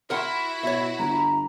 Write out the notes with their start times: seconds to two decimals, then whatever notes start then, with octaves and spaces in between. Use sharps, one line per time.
0.10 E4 F#4 A#4 F#5 C6
0.63 B2 C#5 E5
0.99 G1 A#5